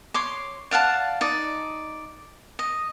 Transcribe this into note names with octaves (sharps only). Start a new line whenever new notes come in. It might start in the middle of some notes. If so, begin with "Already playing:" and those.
C#5 C6 D6
D5 F5 F#5 A5
D#4 D5
D#5